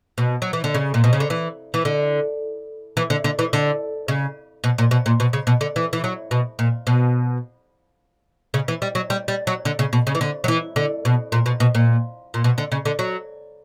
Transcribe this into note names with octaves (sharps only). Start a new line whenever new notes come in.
B2
F#3
E3
D3
C#3
A#2
B2
C#3
D3
E3
E3
D3
E3
D3
D3
E3
D3
C#3
B2
A#2
B2
A#2
B2
C#3
B2
D3
E3
E3
F#3
B2
A#2
B2
C#3
E3
G3
F#3
G3
G3
F#3
D3
C#3
B2
C#3
E3
D3
F#3
E3
D3
B2
A#2
B2
B2
A#2
A#2
B2
D3
C#3
D3
F#3